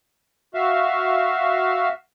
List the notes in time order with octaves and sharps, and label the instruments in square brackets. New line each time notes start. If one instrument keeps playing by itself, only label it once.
[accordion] F#4 E5 F5